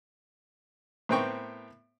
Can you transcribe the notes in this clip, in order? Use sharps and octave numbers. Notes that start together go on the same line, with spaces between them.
A2 B3 C4 A#4 G5 C#6